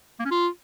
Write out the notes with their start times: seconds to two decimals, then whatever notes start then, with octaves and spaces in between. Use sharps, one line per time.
0.20 A#3
0.25 C#4
0.31 F4